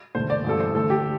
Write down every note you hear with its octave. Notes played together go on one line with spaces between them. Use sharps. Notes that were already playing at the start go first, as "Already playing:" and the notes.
E1 D2 D3 A3 C5
D5
A1 G2 E3 A4
C5
D2 D3 A3 A4
G4